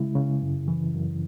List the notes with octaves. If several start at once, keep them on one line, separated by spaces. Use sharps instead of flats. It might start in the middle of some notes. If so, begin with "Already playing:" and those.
Already playing: C#3 G#3 E4
C#3
F#2
E3
F#2